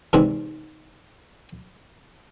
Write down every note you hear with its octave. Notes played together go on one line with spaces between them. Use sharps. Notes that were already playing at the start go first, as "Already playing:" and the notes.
E2 G#2 C3 E3 C4